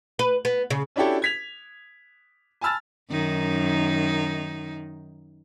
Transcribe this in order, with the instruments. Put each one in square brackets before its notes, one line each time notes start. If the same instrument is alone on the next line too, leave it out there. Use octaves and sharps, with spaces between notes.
[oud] B4
B3
C#3
[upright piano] C#4 D4 E4 F#4 G4 A4
G#6 B6 F7
G#5 A5 B5 E6 F6 A6
[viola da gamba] F#2 D#3 D#4